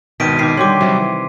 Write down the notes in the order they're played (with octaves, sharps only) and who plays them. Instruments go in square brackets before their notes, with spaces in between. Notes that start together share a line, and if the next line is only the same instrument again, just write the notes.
[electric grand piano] G#1 B2 [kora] D#3 [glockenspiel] B6 D7 D#7
[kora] D#3 [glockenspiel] D6 C7
[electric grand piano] D3 [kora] G3 G4 C#5 [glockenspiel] C6 D6
[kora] C3 [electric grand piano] F#3 G3
[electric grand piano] E3